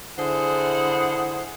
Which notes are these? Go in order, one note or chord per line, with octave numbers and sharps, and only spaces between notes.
D3 E4 G#4 C5 F#5